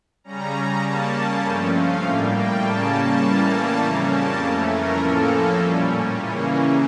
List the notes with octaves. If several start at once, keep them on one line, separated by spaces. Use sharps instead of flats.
C#3 G3 C#4 A#5
C#3 G3 A#3 C#4 A5
G2 F3 A3 C#4 G5
F5
A2 G3 A#3 G5
G5
C#3 G3 A#3 C#4 A5
A2 E3 G3 A#3 C#4 A5
F2 C#3 G3 A#3 C#4 A#5
A5
F2 E3 A3 C#4 A#4
A#4
A2 F3 A#3 C#4 A4
A#2 G3 C#4
C#3 E3 A#3 C#4